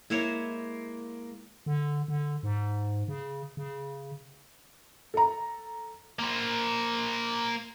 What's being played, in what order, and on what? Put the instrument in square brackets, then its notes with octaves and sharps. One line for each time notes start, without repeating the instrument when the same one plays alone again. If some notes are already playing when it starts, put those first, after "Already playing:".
[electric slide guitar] G#3 A#3 [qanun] E4 C5 C#5
[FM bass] D3
D3
G#2
C#3
C#3
[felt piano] A4 A#5
[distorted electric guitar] A#3 C5